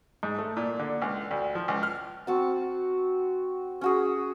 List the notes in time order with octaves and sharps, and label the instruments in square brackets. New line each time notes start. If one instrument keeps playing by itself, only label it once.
[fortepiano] G#2
A3
A#2
D3
C#2
D2
F3
C#2
F6
[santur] C4 F#4 A5
C#4 F#4 G#4